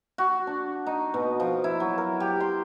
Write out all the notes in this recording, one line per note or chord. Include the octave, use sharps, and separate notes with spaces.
F#4
D4
D#4
B2
F3
E4
F#3
A#4
G4
C6